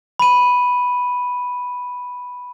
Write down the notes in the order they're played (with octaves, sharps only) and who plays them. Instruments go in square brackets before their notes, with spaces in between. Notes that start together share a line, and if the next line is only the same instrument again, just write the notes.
[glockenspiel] B5 D#7